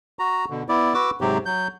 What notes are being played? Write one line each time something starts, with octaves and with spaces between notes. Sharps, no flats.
F#4 A#5
B2 D3
B3 E4 D5
F#4 B4 D6 E6
G#2 C3 F#3 C4 G4
F#3 G6